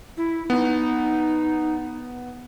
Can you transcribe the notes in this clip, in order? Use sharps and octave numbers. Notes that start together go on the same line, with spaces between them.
E4
B3 D#4